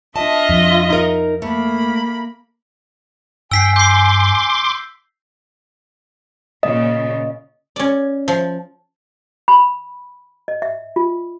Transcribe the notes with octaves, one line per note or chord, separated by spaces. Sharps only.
D4 F4 D#5 E5 A5
F2
D#4 A#4
A3 A#3 B5
G2 G5 G#5 E6 B6 C7
C6 D6 G6 C7
A#2 C#3 D#5
C#4 D5
F3
B5
D#5
E5
F4